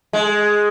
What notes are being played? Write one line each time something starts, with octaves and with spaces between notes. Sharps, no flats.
G#3